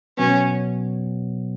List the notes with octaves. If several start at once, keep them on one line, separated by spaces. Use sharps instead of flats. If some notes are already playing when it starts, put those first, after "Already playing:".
B2 F#3 B3 C#4